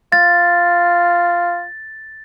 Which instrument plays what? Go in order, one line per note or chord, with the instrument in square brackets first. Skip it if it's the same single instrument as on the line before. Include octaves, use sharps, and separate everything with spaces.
[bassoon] F4 [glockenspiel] A6